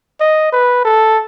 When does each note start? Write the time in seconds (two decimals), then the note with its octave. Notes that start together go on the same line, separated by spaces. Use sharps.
0.20 D#5
0.52 B4
0.85 A4